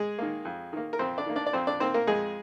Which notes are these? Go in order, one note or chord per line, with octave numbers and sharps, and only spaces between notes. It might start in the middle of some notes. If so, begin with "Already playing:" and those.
Already playing: G#3 G#4
D#3 A#3
F2
D#3 A#3
A#4
F2 C4 C5
D4 D5
D#3 A#3
D4 D5
D5
F2 C4 C5
D4 D5
D#3 A#3 C4 C5
A#3 A#4
F2 G#3 G#4